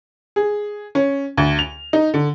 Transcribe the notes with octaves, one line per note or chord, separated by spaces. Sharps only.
G#4
C#4
D2
F7
D#4
D3